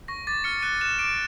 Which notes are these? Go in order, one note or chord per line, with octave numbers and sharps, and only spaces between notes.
C#6 A#6
D6 A6
F6 C#7
F#6 D#7
F#6 E7
D6 D7